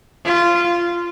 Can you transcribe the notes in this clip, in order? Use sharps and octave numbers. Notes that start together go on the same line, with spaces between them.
F4